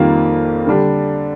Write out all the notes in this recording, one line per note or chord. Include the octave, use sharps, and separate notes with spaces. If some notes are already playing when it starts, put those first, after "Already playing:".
Already playing: F2 D#3 G3 A#3 F4
D3 G3 D4